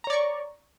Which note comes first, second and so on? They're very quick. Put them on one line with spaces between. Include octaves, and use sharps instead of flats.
A#5 C#5 D5 C#6